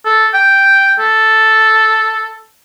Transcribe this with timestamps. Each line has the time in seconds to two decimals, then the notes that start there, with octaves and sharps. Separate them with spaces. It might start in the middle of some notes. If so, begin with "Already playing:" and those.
0.05 A4
0.34 G5
0.99 A4